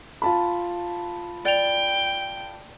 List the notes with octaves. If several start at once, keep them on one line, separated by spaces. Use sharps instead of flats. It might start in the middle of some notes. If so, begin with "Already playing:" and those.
F4 A5 B5
D5 G5 F7